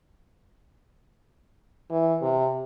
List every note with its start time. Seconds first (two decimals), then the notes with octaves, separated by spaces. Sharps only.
1.90 E3
2.22 C3